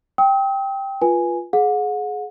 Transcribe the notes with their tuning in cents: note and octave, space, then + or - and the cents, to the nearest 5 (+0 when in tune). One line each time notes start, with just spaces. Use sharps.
G5 +0 D#6 +45
F4 +0 B4 -25 G#5 +0
G#4 +25 F#5 -35